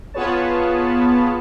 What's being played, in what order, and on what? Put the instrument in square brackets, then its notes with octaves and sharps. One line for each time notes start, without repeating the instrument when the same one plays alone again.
[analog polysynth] B3 F4 G#4 B4 C#5 A5